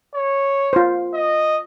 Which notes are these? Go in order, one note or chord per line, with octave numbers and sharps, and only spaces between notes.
C#5
F4 C5
D#5